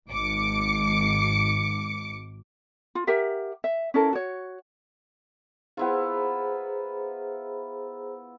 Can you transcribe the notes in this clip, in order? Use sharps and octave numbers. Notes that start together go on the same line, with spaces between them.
G#1 D6 C#7
F4
G4 A#4 E5 F#5
E5
C#4 E4 A4 A#4
F#4 C#5
B3 E4 F4 G#4 C5 A#5